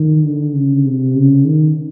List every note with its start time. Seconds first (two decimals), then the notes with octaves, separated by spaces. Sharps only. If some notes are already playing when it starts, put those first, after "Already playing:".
Already playing: D#3
0.24 D3
0.55 C#3
0.85 C3
1.15 C#3
1.44 D#3